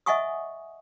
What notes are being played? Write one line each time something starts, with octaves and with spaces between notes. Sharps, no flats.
D#5 E5 F#5 G#5 C#6 D#6